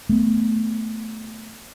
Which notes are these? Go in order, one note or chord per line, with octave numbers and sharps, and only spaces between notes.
A3 B3